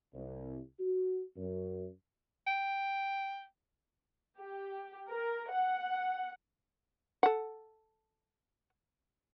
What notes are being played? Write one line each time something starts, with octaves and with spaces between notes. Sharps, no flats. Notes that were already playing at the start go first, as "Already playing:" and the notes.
C2
F#4
F#2
G5
G4
A#4
F#5
A4 F#5